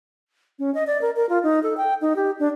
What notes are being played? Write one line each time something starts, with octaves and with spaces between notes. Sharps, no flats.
C#4
D#5
D5
A#4
A#4
F4
D#4
A4
G5
D#4
G4
D4